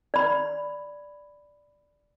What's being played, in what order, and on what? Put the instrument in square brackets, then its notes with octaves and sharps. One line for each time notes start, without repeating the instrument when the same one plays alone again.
[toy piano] D5 B5